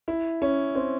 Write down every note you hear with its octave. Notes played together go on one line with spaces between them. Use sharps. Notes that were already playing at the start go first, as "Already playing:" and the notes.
E4
C#4
C4